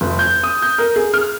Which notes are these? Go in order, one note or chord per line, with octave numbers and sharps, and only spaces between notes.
F1
G6
D#6
G6
A#4
G#4
F6